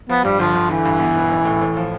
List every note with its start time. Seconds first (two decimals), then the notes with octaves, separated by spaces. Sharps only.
0.09 F3 B3
0.24 G2 G3
0.39 G1 F3
0.55 G1
0.69 D3 E3
0.85 G2
1.00 B3
1.16 E1
1.31 A1
1.45 A2
1.61 A2
1.77 F3